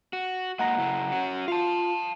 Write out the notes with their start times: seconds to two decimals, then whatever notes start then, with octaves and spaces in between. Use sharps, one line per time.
0.13 F#4
0.59 G#2 A#3 D#5 F#5 A#5 A#6
0.78 F#2 C#3 E4
1.12 C#4 F#4
1.48 F4 F5 A5